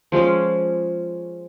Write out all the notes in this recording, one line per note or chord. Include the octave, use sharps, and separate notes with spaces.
F3 G#3 C#4 D6